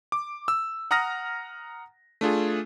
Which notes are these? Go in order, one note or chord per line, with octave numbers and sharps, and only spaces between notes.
D6
E6
F#5 A#5 D#6 F6 A#6
A3 D4 F4 G#4